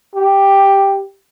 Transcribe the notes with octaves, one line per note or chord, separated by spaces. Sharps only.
G4